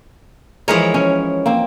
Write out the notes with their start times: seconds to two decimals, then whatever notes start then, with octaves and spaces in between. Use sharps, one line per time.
0.68 E3 F3 G#3 A#4 C#5 D#5
0.94 C#4
1.46 A#3 C4